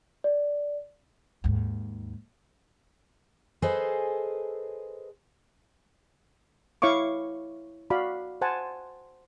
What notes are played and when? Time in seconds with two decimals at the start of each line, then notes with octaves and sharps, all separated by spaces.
0.24 D5
1.44 D#2 G#2
3.62 G#4 A4 B4 C5 D#5 G#5
6.82 E4 C#5 F5 C#6 D6
7.90 F#4 D5 F5 B5
8.41 C5 F#5 G#5 A5